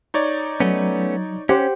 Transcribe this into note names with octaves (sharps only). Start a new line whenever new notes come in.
D#4 C#5 D5
F#3 A3 B3 C#4
C#4 G4 C5 F#5